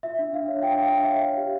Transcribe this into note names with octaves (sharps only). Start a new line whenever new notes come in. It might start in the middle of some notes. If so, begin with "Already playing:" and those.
F4 E5
D4
D4 F5
C#5
F4 G5
D4 F5
D4
C#5 E5
C#5 F5
G4